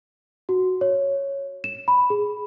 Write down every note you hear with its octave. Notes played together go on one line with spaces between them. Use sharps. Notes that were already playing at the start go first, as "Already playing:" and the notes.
F#4
C#5
E7
B5
G#4